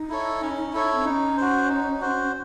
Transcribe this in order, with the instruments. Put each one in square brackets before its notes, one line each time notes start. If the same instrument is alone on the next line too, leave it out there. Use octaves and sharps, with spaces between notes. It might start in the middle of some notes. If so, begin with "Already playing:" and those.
Already playing: [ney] D#4
[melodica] E4 A4 C#5
C#4
E4 A4 C#5
[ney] C4
[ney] C#4 [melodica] D#4
[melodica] F#4 C5
D#4
F#4 C5